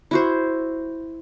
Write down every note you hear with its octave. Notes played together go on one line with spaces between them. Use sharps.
E4 F#4 C5